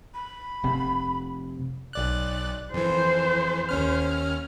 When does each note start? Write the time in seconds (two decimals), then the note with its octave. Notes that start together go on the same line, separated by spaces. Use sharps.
0.14 B5
0.64 F1 C3
1.93 B1 D5 F#6
2.74 F2 E3 C5
3.69 D#2 C#4 F6